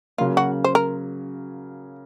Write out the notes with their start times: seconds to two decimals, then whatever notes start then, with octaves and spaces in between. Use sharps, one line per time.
0.18 C#3 F#3 A#3 F4
0.37 F#4
0.64 C5
0.75 A#4